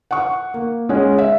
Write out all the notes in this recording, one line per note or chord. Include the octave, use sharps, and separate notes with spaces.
F#5 C#6
A#3
G#3 C#4 G#4 F#5
E5